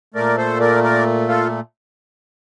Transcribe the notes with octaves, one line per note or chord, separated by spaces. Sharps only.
A#2 A3 A#4 D5
A4 C5
A#4 D5
A#4 D5
F4 A4